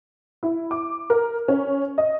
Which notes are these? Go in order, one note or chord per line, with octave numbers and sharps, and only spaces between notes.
E4
D6
A#4
C#4
D#5